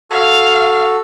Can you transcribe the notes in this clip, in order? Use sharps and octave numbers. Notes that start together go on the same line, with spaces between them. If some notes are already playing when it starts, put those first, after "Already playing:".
F#4 A4 F5